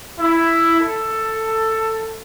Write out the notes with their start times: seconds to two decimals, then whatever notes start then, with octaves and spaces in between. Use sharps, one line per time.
0.19 E4
0.80 A4